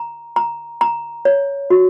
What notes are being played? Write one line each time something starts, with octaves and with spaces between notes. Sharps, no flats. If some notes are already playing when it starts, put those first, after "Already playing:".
Already playing: A#5
A#5
A#5
C#5
F#4